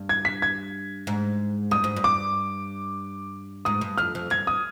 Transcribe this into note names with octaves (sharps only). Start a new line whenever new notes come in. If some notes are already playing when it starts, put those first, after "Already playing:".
Already playing: G2
G#6
B6
G#6
G#2
G2 D#6
G#2
G2
D6
G#2 D#6
G2
F2 F6
F2
G2 G#6
D#6